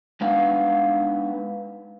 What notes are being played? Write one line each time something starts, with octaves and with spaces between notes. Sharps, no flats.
G#3 B3 D4 D#4 B4 F5